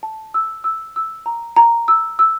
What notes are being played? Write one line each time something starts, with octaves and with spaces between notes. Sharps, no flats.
A5
E6
E6
E6
A#5
A#5
E6
E6